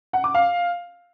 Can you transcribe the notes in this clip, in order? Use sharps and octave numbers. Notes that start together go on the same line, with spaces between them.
F#5
D6
F5